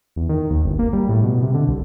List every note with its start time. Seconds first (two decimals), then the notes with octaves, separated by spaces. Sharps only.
0.16 E2
0.29 D#3
0.50 D#2
0.65 G1
0.79 A#3
0.93 G3
1.09 A2
1.23 B2
1.43 C3
1.55 D3
1.68 C2